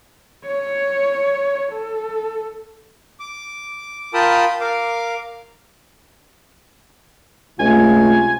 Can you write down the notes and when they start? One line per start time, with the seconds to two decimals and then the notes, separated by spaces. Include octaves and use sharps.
0.45 C#5
1.72 A4
3.20 D6
4.14 F4 A#4 G5 A5 B5 D#6
4.61 A#4 F5 D6
7.59 C#2 C3 A3 F4 G#5